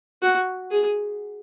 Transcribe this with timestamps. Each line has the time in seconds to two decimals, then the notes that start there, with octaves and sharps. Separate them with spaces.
0.22 F#4
0.71 G#4